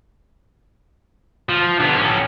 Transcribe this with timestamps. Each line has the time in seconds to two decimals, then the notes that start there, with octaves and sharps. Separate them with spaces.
1.49 F3
1.80 D3 B3
1.97 A2 C#4